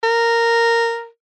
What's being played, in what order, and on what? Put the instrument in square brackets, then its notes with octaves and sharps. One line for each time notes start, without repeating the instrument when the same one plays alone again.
[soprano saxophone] A#4